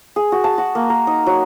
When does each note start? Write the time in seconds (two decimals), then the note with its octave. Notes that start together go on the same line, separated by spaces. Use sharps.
0.16 G#4
0.32 F#4
0.44 A5
0.58 F#4
0.75 A#3
0.90 A#4
1.07 D#4
1.26 F#3